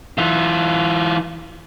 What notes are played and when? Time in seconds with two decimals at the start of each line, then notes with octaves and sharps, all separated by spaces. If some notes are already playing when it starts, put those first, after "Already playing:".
0.18 E3 F4